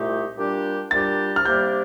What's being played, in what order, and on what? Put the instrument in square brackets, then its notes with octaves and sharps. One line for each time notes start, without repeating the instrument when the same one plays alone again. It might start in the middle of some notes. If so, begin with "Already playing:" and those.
Already playing: [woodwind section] C2 A#2 A3 D#4 G4
A#2 G3 D4 G4
[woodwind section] A#2 G3 D4 G4 [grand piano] A6
[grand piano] F6
[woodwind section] C3 G3 A#3 D4 G4 [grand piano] G6